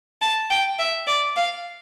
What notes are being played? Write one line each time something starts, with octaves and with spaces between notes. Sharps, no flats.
A5
G5
E5
D5
F5